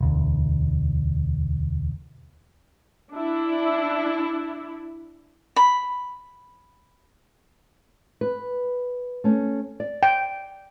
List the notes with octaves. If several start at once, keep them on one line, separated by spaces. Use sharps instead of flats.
E1 D2
D4 E4
B5
B4
A3 C#4
D5
G5